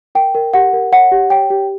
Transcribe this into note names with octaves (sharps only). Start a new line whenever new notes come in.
A#4 G5
A#4
G4 F#5
A#4
C#5 F#5
G4
C#5 G5
G4